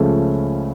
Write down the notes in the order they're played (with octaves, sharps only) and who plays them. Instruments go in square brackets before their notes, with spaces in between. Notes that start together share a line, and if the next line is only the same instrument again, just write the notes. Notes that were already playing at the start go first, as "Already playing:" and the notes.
Already playing: [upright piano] C#2 C#3 F3 A3 C#4